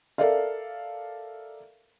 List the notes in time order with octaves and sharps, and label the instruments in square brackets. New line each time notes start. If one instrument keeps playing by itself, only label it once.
[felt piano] A4 A#4 D5 E5 F5